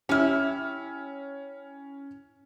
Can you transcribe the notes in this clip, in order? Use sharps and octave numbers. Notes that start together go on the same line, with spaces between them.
C#4 E4 G4 F6